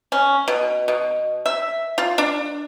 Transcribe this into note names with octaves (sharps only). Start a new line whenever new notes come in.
C#4
B2
B2
E5
F4
D4